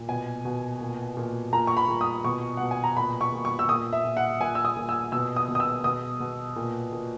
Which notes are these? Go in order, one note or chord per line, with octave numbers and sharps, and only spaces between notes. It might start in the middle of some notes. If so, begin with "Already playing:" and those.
Already playing: A#2
B2 G#5
B2
A#2
A#2
A#2 A#5
C#6
B5
A#2
D#6
B2 C#6
B2 F#5
G#5
A#5
A#2 B5
C#6
A#2
C#6
E6
A#2 D#6
E5
A#2
F#5
A#2 G#5
E6
D#6
A#2
E6
B2 E6
D#6
B2
D#6
E6
B2 D#6
B2
A#2
A#2